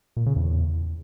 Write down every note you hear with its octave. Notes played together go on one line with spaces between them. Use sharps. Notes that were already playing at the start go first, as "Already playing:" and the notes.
A#2
C#3
E2